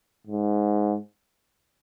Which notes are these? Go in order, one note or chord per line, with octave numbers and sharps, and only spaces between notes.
G#2